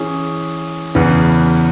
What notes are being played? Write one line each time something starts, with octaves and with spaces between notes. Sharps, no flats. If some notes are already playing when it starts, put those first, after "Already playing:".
Already playing: E3 C#4 G#4
E2 C#3 E3 B3